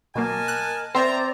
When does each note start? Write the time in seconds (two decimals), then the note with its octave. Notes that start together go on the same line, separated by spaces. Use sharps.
0.15 B2 F#3 A#3 A#4 D#5 G#5 A5
0.48 F#6
0.95 C4 C5 D5 E5 A#5